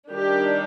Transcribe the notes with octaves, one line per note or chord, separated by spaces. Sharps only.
D#3 G3 D4 G4